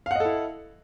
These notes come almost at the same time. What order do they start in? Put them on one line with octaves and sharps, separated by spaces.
F5 F#5 D#5 A4 E4